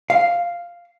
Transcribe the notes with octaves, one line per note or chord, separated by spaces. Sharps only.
F5